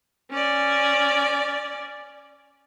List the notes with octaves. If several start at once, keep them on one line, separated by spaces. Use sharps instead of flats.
C#4 D5